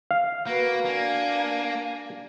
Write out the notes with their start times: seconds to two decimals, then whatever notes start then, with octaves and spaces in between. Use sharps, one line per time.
0.11 F5
0.47 A#3 F#4 B4
0.85 A#3 D4 G#5